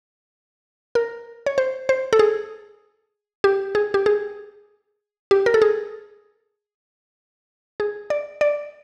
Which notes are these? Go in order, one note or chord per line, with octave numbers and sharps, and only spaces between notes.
A#4
C#5
C5
C5
A4
G#4
G4
G#4
G4
G#4
G4
A#4
A4
G#4
G#4
D5
D5